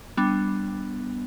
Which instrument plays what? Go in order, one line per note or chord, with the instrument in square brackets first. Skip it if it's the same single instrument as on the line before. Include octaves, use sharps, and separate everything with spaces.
[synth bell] G3 B3 D4